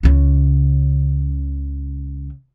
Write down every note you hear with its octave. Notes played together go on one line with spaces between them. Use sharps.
C#2 C#3